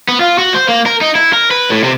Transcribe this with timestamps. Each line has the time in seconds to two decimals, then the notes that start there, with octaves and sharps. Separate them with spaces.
0.09 B3
0.21 F4
0.39 F#4
0.54 C5
0.69 A#3
0.86 A#4
1.01 D#4
1.15 E4
1.33 A#4
1.51 B4
1.70 A2
1.84 C3